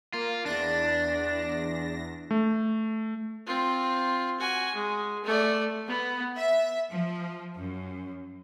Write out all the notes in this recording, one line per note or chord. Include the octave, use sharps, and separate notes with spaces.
A#3 F4
E2 D4 A#6
A3
C4 F4
F#4 G#5
G#3
A3 D5
B3
E5
F3
F#2